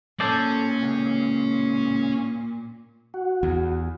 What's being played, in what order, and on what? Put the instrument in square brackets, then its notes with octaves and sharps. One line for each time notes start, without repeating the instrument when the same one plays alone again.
[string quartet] A#2 [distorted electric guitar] C#4 [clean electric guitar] A4 C5 D5
[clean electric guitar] C#2
[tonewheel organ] F#4
[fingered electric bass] E2